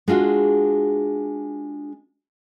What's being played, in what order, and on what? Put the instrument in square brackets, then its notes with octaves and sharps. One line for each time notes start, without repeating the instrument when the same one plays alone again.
[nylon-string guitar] G#3 D4 F4 F#4 G#4